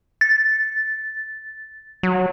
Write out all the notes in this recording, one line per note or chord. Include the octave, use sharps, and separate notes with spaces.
A6
F#3